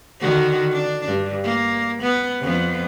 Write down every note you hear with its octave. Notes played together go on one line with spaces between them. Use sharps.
D3 D#3 F#4
D4
G2
A#3
B3
F2 B3